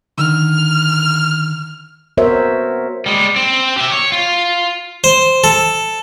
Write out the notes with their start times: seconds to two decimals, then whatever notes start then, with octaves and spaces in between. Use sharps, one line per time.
0.18 D3 D#3 F6
2.17 B3 F#4 A#4 C5 C#5 E5
3.06 G3 G#3
3.36 C4
3.78 G4 E5
3.92 C#5
4.12 F4
5.04 C5
5.44 A4